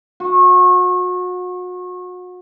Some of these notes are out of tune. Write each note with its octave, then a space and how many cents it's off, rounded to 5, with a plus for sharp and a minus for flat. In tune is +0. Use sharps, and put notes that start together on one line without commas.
F#4 -35